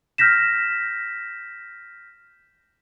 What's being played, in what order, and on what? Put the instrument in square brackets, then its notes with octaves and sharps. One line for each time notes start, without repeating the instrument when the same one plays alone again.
[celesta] F6 G6 A#6 B6 E7